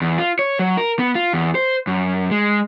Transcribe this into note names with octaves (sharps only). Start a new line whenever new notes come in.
E2
F4
C#5
F#3
A#4
B3
F4
E2
C5
F#2
G#3